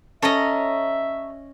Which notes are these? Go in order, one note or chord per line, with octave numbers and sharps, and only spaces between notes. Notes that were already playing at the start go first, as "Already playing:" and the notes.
C#4 A4 C#5 D#5 E5 A#5